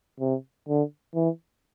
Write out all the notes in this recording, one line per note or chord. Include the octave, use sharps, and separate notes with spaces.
C3
D3
E3